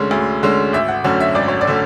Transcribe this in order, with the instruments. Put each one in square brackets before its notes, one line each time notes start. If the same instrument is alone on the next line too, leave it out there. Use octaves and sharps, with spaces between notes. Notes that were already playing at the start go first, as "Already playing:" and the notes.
Already playing: [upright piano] D2 D3 G#3 C#4
D2
D3 G#3 C#4
G#1 E5
F#5
F#2 D3 A3 C#4 F#5
E5
G#1 D5
C#5
D5
D3 A3 C#4